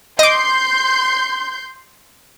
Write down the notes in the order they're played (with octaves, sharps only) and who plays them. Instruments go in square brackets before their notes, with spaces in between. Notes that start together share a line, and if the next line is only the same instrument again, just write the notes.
[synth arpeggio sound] D#5 D6 [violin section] C6 G6